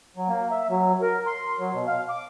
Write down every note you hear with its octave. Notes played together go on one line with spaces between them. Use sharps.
F#3
A#3
E5
F#3
A#4
C6
F#3
B2
F5
D6